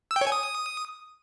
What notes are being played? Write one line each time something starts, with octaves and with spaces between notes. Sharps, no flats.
E6
G5
C#5
G#5
D#6